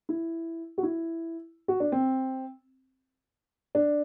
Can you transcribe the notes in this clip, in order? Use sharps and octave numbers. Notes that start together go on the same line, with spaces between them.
E4
F#4
E4
F#4
D4
C4
D4